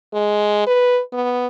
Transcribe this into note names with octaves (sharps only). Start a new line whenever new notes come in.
G#3
B4
B3